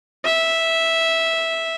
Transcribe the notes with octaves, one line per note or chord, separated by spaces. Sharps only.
E5